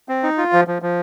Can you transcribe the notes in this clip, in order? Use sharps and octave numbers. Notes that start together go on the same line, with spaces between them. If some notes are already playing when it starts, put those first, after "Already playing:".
C4
D#4
F4
F3
F3
F3